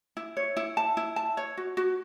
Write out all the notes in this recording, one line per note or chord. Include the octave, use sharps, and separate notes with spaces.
E4
C#5
E4
A5
E4
A5
C#5
F#4
F#4